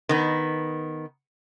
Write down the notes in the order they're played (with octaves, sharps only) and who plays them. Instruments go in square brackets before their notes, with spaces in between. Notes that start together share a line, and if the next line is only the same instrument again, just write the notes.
[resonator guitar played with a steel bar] D#3 B3